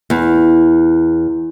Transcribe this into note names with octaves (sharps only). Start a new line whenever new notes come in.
E2